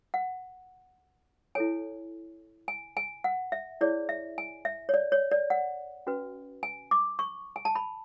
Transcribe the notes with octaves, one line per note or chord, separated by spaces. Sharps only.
F#5
E4 A4 C#5 G#5
G#5
G#5
F#5
E5
E4 G#4 C#5 D5
E5
G#5
E5
C#5
D5
C#5
D5
F#5
C#4 F#4 B4
G#5
D6
C#6
G#5
A5
B5